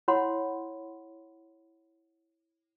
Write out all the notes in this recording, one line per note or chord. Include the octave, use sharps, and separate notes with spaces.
E4 C#5 F#5 B5 C6